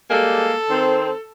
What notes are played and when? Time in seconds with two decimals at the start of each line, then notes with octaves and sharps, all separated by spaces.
0.10 G3 G#3 A#3 A4
0.70 D#3 C4